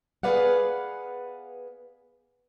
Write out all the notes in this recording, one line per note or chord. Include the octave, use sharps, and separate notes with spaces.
B3 G#4 B4 D5 F5 F#5